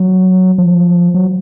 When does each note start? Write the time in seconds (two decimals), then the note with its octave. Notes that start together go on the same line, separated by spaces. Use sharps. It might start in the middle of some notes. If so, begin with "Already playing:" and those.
Already playing: F#3
0.58 F3
1.14 F#3